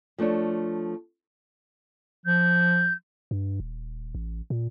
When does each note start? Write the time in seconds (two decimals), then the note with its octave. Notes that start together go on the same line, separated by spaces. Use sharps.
0.18 F3 A3 D4 C#5
2.26 F3 G6
3.31 G2
3.60 D#1
4.15 A1
4.50 A#2